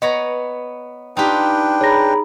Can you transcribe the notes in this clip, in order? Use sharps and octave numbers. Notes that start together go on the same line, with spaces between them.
B3 C#5 D#5 A#5
D4 D#4 F4 G4 B4 G5
G#4 C#5 A#5 B5 A#6